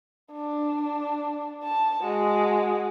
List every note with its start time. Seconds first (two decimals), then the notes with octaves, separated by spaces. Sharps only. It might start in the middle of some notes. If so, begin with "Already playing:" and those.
0.32 D4
1.64 A5
2.02 G#3 F#4